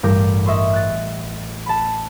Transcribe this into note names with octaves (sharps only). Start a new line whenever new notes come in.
A1 G2 A#4 D6 G6
D#5 E5 C6 C#6
F#6 A6
A5 B5